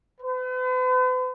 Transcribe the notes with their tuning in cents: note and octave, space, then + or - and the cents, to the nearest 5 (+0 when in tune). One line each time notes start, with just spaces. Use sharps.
B4 +45